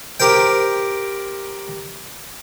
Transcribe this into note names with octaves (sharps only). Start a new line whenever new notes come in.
G4 A#4 C5 G5